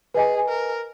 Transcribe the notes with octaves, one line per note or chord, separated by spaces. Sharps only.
G#4 B4 D#5 G#5
A#4